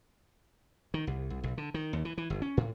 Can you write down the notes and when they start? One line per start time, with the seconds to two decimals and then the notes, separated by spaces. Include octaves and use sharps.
0.94 D#3
1.07 C2
1.30 C2
1.44 B1
1.58 D3
1.74 D#3
1.93 D#2
2.05 E3
2.18 E3
2.30 G1
2.42 C#4
2.57 A2